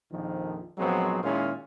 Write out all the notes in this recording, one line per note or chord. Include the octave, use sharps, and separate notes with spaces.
A#1 F2 D#3 F3
A#1 F3 F#3 G#3 B3 C4
A#2 D#3 G#3 C#4 E4 F4